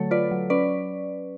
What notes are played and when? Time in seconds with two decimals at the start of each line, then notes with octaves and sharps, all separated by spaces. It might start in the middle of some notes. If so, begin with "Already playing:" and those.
Already playing: D3 F#3 A3 A4 C#5
0.11 F4 B4 D5
0.31 F#3
0.50 C#4 B4 D5